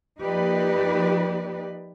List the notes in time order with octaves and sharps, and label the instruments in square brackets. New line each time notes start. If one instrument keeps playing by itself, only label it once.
[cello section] F3 A#3 D#4 G4 B4 D5